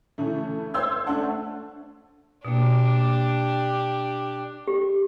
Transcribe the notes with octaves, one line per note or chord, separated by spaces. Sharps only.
C#3 E3 A3
C5 C6 E6 G#6
A3 C#4 D4 F#5 A5
B2 A#3 D4 G4
G4